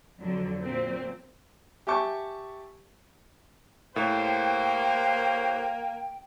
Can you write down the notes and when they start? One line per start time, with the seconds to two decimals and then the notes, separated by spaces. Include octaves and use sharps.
0.20 F2 D3 F#3
0.61 A#2 F#3 C4
1.87 G4 E5 G#5 A5 C#6
3.96 A2 A#3 G4 C5 G5